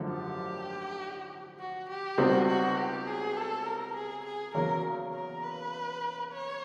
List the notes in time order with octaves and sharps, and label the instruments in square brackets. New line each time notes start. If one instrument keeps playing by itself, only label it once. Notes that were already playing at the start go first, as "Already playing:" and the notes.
Already playing: [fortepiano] G#1 F#2 D3 F3 A3
[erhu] G4
F#4
G4
[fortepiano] C#2 B2 G3 C4 D#4 [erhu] F#4
[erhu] F#4
G4
G#4
A4
A#4
G#4
G#4
[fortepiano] E2 C#3 F#3 A#3 [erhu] A#4
[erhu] A#4
B4
C#5